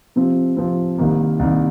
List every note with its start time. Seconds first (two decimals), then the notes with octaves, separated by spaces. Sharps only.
0.16 C3 F3 C4
0.57 C3 F3 C4
0.98 C2 C3 D#3 A#3
1.39 C2 C3 D#3 A#3